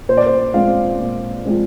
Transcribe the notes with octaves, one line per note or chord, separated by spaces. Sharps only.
A#2 C5
D5
C5
F3 G#3 C4 F5
A#2
F3 G#3 C4